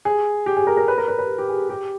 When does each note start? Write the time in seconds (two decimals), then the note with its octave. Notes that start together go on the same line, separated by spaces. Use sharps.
0.05 G#4
0.46 G4
0.57 G#4
0.67 A#4
0.77 A#4
0.88 B4
0.98 A#4
1.08 B4
1.18 B4
1.38 G4
1.49 G#4
1.69 G4